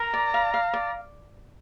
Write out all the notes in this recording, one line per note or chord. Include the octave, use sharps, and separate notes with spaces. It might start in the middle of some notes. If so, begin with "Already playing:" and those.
Already playing: A#4 A#5
D5
F5
F5
D5